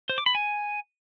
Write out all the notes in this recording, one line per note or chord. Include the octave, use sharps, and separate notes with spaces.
C5
D6
B5
G#5